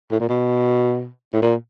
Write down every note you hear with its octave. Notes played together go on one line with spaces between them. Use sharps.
A2
A#2
B2
A2
A#2